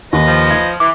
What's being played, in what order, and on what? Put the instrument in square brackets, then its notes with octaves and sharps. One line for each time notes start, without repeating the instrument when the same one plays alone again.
[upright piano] D#2 [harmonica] B4 D#5
[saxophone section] F3
[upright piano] G#6
[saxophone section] E3 [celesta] D6